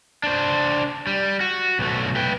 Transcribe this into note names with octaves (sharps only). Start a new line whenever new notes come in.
D4 C5
G3
F#4
B1 A3
B4 G5